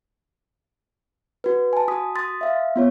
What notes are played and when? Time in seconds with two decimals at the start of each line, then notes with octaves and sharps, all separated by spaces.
1.44 F#4 B4
1.73 G#5 A5
1.88 F#4 D#6 B6
2.16 C6 D#6 A6 B6
2.41 E5 F5
2.76 B3 F4 C#5